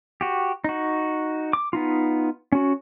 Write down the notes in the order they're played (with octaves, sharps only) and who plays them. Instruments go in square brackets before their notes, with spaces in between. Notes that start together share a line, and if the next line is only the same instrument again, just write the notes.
[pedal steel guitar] F#4 G4
D#4 F#4
D6
B3 D#4 F4
C#4 F#4